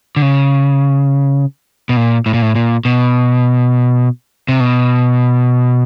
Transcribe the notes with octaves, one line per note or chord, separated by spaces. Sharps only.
D3
C#3
B2
A#2
A2
A#2
A2
A#2
B2
C3
B2